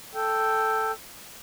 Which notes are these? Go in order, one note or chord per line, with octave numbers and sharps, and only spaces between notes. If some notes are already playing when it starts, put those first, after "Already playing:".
A4 G5